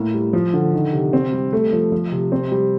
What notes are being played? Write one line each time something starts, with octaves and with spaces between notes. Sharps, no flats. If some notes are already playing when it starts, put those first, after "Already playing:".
Already playing: A2 A#3
G3
F3
D3
D#3
C3
C4
G3
A3
F3
F3
C3
C4
G3